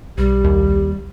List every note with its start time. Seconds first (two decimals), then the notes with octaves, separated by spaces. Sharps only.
0.18 B1 G3 G4
0.44 D#2